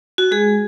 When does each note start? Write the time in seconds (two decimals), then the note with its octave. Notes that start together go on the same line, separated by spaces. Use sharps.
0.18 F#4
0.31 G#3 G#4